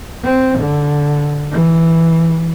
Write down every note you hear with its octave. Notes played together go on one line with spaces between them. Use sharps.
C4
D3
E3